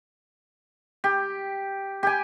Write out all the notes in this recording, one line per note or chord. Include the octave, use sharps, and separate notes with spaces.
G4
G4 G#5